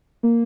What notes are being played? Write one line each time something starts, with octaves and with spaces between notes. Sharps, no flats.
A#3